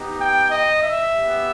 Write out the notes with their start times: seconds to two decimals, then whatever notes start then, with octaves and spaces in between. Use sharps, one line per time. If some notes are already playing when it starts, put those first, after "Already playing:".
Already playing: B3 D#4 G4
0.18 G5
0.50 D#5
0.81 E5
1.13 B3 G4